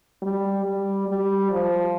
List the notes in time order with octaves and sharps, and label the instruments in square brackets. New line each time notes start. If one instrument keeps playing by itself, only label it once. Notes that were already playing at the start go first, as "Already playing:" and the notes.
[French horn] G3
G3
G3
F3